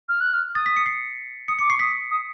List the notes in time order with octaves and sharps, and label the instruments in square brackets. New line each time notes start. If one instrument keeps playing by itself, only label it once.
[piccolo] F6
F#6
F6
[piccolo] D#6 [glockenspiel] A6
[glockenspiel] B6
C#7
C7
[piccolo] D#6 [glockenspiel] C#7
[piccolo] D6 [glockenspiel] C#7
[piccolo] C#6 [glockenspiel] C7
[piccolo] D#6 [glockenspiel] B6
[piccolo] D#6